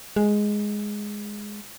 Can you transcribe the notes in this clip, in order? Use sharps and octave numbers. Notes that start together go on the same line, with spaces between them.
G#3